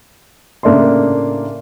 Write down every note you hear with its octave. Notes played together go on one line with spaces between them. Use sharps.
A2 C#3 A#3 D4 E5 C6